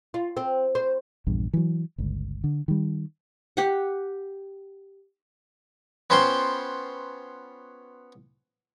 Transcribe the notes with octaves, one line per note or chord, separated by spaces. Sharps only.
F4
C4
C5
A#1 E2 G2
E3 F#3
G1 C#2
D3
D#3 G3
G4 F#5
B3 C#4 F4 C5 G5 C6